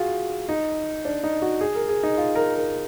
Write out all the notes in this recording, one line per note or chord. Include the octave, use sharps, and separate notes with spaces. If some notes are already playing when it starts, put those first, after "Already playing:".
Already playing: F4 F#4 G#4
D#4
D4
D#4
F#4
G#4
A#4
G#4
D#4
F4
A#4
A#4